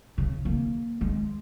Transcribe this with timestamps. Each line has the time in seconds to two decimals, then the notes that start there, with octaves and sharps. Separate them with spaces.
0.18 C#3
0.45 A#3
1.01 G#3